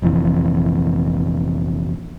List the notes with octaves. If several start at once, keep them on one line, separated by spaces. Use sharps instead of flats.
F1 A#1 F2 E3